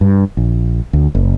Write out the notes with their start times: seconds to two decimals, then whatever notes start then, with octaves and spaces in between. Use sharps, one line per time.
0.01 G2
0.37 A#1
0.93 D2
1.15 F#1